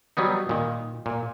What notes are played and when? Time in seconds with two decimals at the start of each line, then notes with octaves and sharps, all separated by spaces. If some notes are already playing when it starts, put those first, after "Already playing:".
0.17 F#3 G3 B3 D#4
0.49 A#2 D#3
1.06 A#2